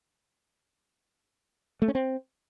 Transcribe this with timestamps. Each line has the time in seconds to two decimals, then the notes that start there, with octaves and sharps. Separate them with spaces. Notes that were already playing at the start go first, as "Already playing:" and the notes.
1.82 A3
1.88 C#4
1.95 C4